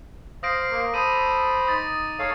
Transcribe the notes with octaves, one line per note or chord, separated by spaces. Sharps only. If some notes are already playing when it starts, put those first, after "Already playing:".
C5 F5 D#6 A#6 D7
A#3
A4 C5 B5 D6 D#6 D#7
D#4 D#6 A6
A4 C#5 F5